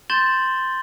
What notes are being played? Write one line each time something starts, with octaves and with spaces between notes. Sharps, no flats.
C6 G6 A6 E7 F#7 G7